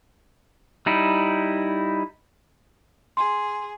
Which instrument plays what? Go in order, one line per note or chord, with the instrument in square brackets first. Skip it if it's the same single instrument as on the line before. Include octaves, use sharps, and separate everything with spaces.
[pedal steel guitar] G3 D#4 E4
[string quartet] G#4 [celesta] C6